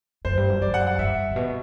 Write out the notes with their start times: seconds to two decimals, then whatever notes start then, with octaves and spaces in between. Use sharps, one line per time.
0.25 F#2 C5
0.37 G2
0.49 F#2
0.62 F#2 D5
0.74 F#5
0.87 F#5
0.99 G2 E5
1.31 A2
1.36 B2